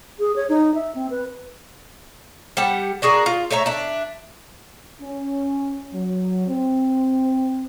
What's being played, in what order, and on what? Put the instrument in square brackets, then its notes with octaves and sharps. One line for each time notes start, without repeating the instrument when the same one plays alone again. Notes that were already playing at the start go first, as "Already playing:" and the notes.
[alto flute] G#4
C#5
D#4
E5
C4
B4
[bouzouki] G3 G4 F#5 A5
D4 F#4 G#4 A#4
F4
A3 C#5 E5 A#5
D4 E5
[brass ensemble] C#4
F#3
C4